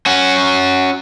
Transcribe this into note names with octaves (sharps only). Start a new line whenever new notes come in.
C#4 F#4